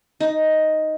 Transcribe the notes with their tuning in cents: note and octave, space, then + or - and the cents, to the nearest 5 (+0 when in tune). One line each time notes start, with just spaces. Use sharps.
D#4 +5